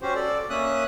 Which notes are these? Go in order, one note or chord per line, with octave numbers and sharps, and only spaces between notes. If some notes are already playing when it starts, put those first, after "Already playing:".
C#4 F#4 G4 C5
A4 D5
A#3 C#4 E5 D#6 F#6